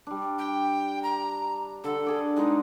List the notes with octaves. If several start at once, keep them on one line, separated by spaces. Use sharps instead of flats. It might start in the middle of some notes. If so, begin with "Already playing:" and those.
G3 D4
G5
A#5
D3 A4 F#5
D3 G#4 D5
G#3 B3 D#4